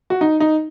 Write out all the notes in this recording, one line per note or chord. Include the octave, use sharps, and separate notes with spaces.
F#4
D#4
D#4